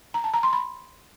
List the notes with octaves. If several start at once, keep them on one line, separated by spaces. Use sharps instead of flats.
A#5
A5
A#5
C6
B5